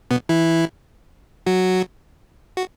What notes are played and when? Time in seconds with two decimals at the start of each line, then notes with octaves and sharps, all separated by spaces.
0.11 B2 B3
0.29 E3 E4
1.46 F#3 F#4
2.57 F#4